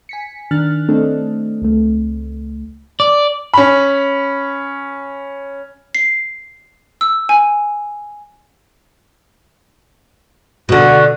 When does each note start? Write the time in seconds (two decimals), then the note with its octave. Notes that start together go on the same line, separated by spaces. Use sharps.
0.09 G#5 B6 C#7
0.51 D#3 D4 F6 F#6 A6
0.89 A3 C4 D4 A4 D#5
1.62 C#2 A3
3.00 D5
3.54 C#4 B5
5.95 C7
7.01 E6
7.29 G#5
10.69 B2 D3 F#4